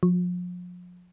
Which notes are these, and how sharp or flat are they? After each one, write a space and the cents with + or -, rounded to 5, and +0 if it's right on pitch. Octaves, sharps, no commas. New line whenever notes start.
F3 +35